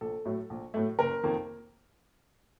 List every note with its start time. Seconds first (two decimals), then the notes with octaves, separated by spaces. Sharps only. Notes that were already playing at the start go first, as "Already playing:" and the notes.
0.01 A#1 A4
0.25 A2 F#3 A3
0.50 A#1
0.74 A2 F#3 A3
0.99 F#1 A#4
1.23 F2 D#3 A#3